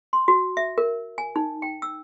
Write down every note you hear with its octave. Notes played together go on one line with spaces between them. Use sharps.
C6
F#4
E5
A#4
G#5
D#4
G5
E6